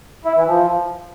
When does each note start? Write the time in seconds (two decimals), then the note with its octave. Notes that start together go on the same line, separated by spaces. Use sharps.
0.25 E4
0.36 E3
0.47 F3